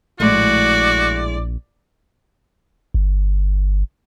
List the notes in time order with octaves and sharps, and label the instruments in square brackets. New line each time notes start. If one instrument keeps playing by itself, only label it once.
[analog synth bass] A#1 [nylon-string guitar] A2 G#3 A3 [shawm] F#4 [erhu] D5
[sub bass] G1